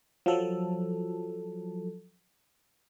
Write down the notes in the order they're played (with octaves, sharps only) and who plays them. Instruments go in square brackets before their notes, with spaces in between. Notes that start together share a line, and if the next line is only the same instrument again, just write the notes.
[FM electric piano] F3 F#3 A4